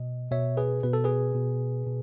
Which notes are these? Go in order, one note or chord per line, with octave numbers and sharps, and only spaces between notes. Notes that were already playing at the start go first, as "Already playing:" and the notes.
Already playing: B2 D#5
B2 C#5 E5
G#4 B4
B2 B4
A4
G#4 B4
B2
B2